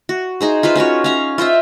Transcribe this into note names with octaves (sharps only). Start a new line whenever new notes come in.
F#4
D#4 G#4 C5
F4 B4 C5 F5
C#4 F4 F#4 C#5
C#4 F5 A#5
F4 C5 D#5 E5